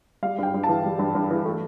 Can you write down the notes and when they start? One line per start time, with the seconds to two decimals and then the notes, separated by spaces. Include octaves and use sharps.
0.23 G3 F5
0.38 G2 G5
0.54 G2
0.64 A5
0.69 E3
0.84 G3
0.99 G2
1.15 G2
1.31 E3
1.45 A3